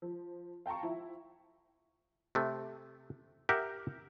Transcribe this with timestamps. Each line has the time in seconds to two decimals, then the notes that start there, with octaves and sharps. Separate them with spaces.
0.02 F3
0.66 F5 G5 A5 A#5 C#6
0.83 F3 E4
2.35 C3 A3
3.49 G4 A#4 E5 F#5